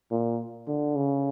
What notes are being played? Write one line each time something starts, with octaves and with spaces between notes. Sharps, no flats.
A#2
D3
C#3